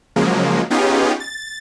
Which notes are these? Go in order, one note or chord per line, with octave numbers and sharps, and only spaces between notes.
C#3 F3 F#3 G#3 A#3
B3 C#4 D#4 F4 G4 G#4
A6